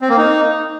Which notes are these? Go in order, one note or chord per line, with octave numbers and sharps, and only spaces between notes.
C4
A#3
D#4